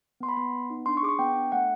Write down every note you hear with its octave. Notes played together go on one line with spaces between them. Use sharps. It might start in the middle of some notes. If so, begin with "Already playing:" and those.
B3 C6
B5
B3 C6
B3
D#4
D4 C6
C#6
G#4 D6
C#6
B3 G5
D4
A3 F#5